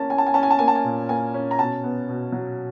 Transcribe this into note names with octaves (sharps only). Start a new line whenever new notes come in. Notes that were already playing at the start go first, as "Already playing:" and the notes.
Already playing: A#3 C#4 A5
C#4 G#5
A5
G#5
C#4 A5
G#5
A5
A#3 G#5
A5
G#5
A#2
A#3 G#5
C#4
A#5
B2 A5
B3
B2
F#3